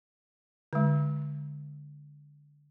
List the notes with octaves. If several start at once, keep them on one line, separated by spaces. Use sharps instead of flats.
D3 G#3